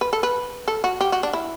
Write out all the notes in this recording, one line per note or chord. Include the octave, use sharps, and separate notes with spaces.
B4
A4
B4
A4
F#4
G4
F#4
D4
E4